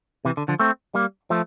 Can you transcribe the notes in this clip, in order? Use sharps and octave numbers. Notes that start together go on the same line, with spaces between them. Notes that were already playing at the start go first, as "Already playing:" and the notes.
C3 E3
D3
D3 F3
A3 C4
G3 A#3
F3 A3